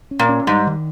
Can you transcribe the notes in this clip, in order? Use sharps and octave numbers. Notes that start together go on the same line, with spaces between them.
C#4
A#2
C#4
G#2 G3
D#3